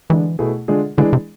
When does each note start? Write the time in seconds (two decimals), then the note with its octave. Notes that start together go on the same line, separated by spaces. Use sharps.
0.10 D3 E3 G#3 D4
0.39 B2 A3 E4 G#4
0.68 D3 G#3 D4 F4 G#4
0.97 D3 E3 G#3 D4 G#4
1.13 C3